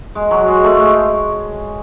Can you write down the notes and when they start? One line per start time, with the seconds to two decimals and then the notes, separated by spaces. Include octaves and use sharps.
0.15 G#3
0.31 F#3
0.47 G#3
0.64 A3
0.80 G#3